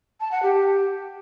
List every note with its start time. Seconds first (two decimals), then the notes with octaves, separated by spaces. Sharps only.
0.20 A5
0.32 F#5
0.43 G4